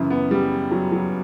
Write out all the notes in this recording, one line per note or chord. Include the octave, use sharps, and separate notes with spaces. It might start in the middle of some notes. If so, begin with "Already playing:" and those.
Already playing: F#2 C#3 E3
B3
G3
F#3
F#3